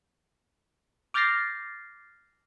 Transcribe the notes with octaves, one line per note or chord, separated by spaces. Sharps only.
D6 F6 G6 A6 A#6 C7